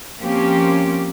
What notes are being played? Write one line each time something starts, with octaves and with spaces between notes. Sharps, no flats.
F3 A#3 C4 C#4 G4